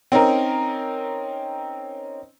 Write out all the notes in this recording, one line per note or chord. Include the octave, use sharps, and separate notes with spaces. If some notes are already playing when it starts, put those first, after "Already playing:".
C4 C#4 D#4 A#4